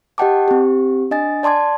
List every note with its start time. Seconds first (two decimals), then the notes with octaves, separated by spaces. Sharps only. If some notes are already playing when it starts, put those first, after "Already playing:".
0.18 G4 D#5 F#5 G5 A5 D6
0.48 C4 G4
1.11 D4 D#5 G#5 A6
1.43 D5 A5 C6 D6 G#6